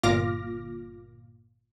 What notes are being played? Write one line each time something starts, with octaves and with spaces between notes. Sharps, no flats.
G1 A#2 F4 D6 F6 A#6